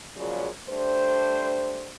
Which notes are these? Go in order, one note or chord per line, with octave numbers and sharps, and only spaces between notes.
A#2 C#3 F3 F#3 G#3 D5
G3 A3 D4 C5